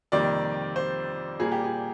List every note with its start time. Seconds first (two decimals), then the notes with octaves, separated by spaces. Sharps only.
0.12 F2 C3 D#3 G3 A#3 D5
0.76 C5
1.40 A#2 G3 A#3 G#4
1.52 G4
1.64 G#4